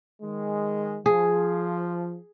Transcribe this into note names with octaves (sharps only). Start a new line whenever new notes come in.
D#3 G#3
F3 G#4